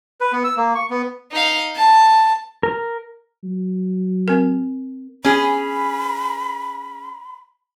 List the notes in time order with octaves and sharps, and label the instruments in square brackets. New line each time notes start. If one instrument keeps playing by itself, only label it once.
[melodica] B4
B3
E6
A#3
C#6
B3
[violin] D#4 F5
A5
[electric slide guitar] A#4
[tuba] F#3
[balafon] C4 A#4
[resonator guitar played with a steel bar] C#4 G#4 [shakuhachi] B5